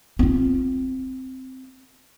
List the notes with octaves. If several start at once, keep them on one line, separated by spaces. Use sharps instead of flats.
C4 F4